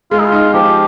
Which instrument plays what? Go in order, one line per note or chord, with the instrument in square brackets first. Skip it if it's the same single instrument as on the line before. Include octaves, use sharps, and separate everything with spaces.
[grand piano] G#3 [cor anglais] F4
[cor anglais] D#4
F4
[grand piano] D#4
[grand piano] F3 [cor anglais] G4